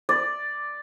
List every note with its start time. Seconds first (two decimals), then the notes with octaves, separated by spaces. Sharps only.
0.09 D5